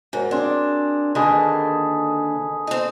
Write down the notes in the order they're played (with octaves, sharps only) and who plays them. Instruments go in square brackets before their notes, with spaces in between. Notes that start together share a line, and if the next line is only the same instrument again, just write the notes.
[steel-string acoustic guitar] G#2 [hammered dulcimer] F#3 A#4
[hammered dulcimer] C4 G#4 [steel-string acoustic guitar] D4
[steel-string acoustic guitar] D3 D#3 A#3 [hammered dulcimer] G#4 A4 B4
[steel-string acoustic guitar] C4 D#4